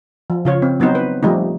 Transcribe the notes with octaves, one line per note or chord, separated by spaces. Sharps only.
F3
C#3 F4 C#5
C4
F#3 B3 C4 D#4 C5
B4
F3 G3 A3 D#4